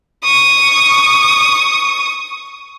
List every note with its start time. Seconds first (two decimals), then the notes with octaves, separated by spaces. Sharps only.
0.24 C#6 D#6